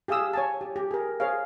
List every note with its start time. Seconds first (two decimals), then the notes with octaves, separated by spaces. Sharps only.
0.08 G4 G#4 F5 D#6 E6
0.33 C#5 G#5 A5
0.61 G4
0.76 G4
0.91 G#4 A#4
1.20 G#4 C5 C#5 F5